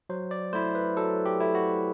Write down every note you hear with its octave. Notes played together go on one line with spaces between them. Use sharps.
F#3 C5
D5
A3 E4 C5
B4
F#3 A4
G4
A3 E4
F#4